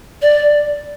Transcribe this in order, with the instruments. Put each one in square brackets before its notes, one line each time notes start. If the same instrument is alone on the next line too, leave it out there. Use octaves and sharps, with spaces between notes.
[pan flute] D5